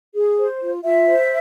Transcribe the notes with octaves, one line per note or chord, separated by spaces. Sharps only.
G#4
C5
F4
F4 E5
C5